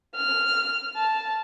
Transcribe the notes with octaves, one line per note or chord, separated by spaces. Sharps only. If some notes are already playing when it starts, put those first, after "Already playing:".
F6
A5